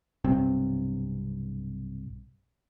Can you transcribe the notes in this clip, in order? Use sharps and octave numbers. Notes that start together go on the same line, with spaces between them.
B1 G2 C3 C4